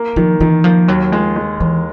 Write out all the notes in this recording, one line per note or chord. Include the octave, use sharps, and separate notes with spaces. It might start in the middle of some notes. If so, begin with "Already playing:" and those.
Already playing: A#3
D#3 F3
D#3 E3
F3 A#3
D#2 F#3
F3 G#3
G#3
D#2 E3